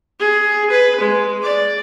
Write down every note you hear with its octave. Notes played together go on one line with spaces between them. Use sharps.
G#4
B4
G#3
D5